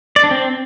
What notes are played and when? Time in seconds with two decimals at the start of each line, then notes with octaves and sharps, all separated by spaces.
0.16 D5
0.24 D4
0.31 C4